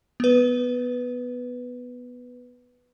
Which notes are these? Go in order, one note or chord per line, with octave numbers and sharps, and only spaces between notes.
B3 B4